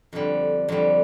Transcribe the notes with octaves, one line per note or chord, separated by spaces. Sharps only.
F2 D3 G3
F2 D3 G3